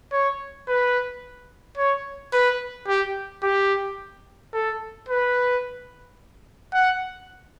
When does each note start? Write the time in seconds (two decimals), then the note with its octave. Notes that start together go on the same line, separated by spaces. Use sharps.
0.12 C#5
0.68 B4
1.78 C#5
2.33 B4
2.87 G4
3.43 G4
4.54 A4
5.08 B4
6.74 F#5